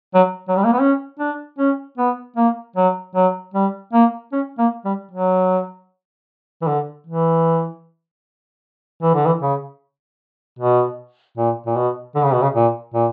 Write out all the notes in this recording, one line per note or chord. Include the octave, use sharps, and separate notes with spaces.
F#3
F#3
G3
A#3
B3
C#4
D4
C#4
B3
A#3
F#3
F#3
G3
A#3
C#4
A#3
G3
F#3
E3
D3
E3
E3
D3
E3
C#3
B2
A#2
A#2
B2
D3
C#3
B2
C#3
A#2
A#2